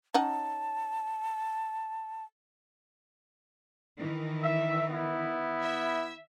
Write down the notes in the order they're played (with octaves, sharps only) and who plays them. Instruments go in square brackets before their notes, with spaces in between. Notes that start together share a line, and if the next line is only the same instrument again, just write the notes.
[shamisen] C#4 D#4 F#5 [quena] A5
[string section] D#3 E3
[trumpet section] E5
B3 E4
[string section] E5